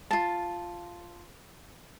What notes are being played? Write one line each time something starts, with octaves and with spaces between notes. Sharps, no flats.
F4 A5